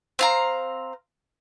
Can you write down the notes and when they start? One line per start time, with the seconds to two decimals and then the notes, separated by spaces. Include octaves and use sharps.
0.19 C4 F5 A#5